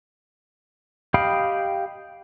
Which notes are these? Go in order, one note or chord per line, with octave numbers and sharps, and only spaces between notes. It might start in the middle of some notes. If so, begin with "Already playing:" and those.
G4 D#5 F5 G5 B5